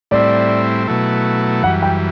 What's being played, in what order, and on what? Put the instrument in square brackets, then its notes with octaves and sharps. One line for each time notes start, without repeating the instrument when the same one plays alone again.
[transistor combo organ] A2 G3 C4 E4 [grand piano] D5
[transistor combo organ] B2 F#3 A3 E4
[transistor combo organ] F#2 E3 G3 [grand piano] F#5
[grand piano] G5